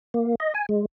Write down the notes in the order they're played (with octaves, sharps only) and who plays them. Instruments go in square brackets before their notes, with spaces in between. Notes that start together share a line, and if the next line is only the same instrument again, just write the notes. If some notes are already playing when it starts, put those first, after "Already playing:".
[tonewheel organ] A#3
D#5
G#5
G#3